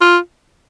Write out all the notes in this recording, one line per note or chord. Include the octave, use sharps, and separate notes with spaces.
F4